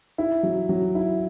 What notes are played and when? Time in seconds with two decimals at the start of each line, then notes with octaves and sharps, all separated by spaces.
0.18 E4
0.43 F#3
0.69 F#3
0.95 E4